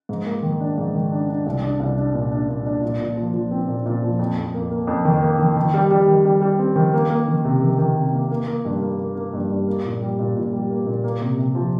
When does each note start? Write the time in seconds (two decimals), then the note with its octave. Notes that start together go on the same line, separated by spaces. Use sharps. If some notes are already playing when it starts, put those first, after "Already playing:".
0.09 G#2
0.26 A#3
0.43 D#3
0.60 D4
0.78 G#2
0.95 D#3
1.12 D4
1.29 D4
1.46 C2
1.63 D4
1.80 C2
1.97 D4
2.14 A#2
2.31 D4
2.49 A#2
2.66 D4
2.82 A#2
3.00 A#2
3.17 F3
3.34 F3
3.51 C4
3.68 A#2
3.86 A#2
4.03 F3
4.19 F2
4.37 F2
4.54 A#3
4.71 A#3
4.87 F2
5.05 D#3
5.23 A#3
5.39 D#3
5.56 D#3
5.74 G3
5.91 G3
6.08 D#3
6.25 G3
6.41 G3
6.59 C4
6.76 D#3
6.94 A#3
7.10 A#3
7.28 D#3
7.45 C3
7.62 D#3
7.78 D#3
7.96 C3
8.13 A#3
8.31 A#3
8.47 A#3
8.65 G2
8.82 A#3
8.99 A#3
9.15 A#3
9.33 G2
9.50 G2
9.68 A#3
9.85 A#2
10.01 G3
10.19 A#2
10.36 A#2
10.53 G3
10.70 A#3
10.86 A#2
11.04 A#3
11.21 C3
11.39 C3
11.55 F3